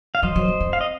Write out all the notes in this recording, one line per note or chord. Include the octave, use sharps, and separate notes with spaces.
F5
F#3 C5 D#5
F#3
A#3
C4
F5
D#5